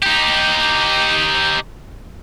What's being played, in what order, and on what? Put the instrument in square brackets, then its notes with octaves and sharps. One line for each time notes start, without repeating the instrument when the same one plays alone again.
[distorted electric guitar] D#4 G4